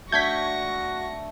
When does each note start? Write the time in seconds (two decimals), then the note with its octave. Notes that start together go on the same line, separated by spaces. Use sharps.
0.12 A3 D4 F#4 C#6 G6 G#6 A#6 B6